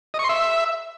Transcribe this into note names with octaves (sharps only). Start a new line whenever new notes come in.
D#5
C#6
C6
E5